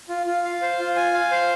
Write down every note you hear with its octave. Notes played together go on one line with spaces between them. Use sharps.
F4
F4
F5
C5
F4
G#5
F5
C5